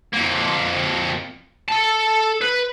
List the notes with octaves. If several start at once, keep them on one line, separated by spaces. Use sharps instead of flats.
F2 A#3
A4 A5
B4